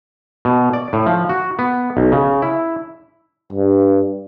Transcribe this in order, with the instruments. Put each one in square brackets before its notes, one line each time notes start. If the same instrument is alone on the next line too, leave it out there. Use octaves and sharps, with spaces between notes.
[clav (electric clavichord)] B2
D5
A2
F3
F#4
B3
B1
C#3
E4
[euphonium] G2